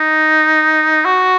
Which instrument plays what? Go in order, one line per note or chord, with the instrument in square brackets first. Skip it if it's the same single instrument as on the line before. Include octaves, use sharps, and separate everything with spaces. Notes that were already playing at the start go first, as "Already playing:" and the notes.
Already playing: [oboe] D#4
F#4